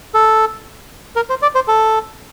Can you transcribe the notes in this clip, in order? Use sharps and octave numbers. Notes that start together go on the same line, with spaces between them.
A4
A#4
C5
D5
C5
A4